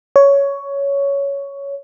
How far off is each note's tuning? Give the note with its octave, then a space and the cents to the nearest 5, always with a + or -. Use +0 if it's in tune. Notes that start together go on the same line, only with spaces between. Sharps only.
C#5 +10